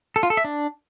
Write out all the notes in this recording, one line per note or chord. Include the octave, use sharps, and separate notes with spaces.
A4
F4
A4
E5
D4